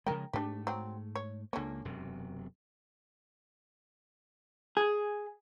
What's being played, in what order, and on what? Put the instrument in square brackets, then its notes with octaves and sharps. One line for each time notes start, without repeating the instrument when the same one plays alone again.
[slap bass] C#3 F3 G#3 [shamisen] A#4 G5
[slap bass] G#2 A3 [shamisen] D4 G4
[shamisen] F#3 C4
C#5
[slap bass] C#2 A#3 [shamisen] D3 C#4
[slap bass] E1 F#2 C3
[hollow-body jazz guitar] G#4